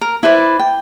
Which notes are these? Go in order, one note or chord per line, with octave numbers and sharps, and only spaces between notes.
A#4
E4 B4 C5 D5
G5